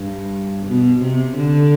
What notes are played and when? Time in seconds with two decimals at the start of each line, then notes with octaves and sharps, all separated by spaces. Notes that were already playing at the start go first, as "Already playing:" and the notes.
Already playing: G2
0.66 B2
1.01 C3
1.36 D3